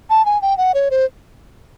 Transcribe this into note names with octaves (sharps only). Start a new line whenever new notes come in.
A5
G#5
G5
F#5
C#5
C5